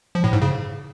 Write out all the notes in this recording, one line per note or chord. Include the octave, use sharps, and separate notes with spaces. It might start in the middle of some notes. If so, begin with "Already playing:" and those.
F3
A2
G#2
C#3